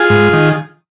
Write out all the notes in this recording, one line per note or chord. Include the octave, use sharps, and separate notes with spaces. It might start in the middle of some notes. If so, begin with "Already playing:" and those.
Already playing: F4 G#4
G#2
D#3